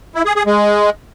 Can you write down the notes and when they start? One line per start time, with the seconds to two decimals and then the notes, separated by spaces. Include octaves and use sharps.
0.15 E4
0.25 G#4
0.36 G#4
0.46 G#3